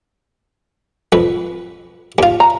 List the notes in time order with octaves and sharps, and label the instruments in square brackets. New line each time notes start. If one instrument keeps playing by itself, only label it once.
[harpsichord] F2 B4
D#2 F4
[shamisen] A#5